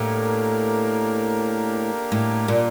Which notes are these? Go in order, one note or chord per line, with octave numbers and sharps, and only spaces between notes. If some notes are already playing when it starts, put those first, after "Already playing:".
Already playing: A2 A#3 D4 G4 A#4
A2
A#2